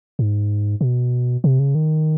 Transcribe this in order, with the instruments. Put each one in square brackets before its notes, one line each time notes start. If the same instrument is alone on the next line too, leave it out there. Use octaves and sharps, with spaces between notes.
[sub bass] G#2
B2
C3
C#3
D#3